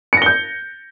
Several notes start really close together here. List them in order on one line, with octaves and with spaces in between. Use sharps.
C#7 A#6 G7 G6